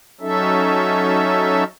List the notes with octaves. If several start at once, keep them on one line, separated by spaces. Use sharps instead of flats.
F#3 C#4 D#4 A4 E5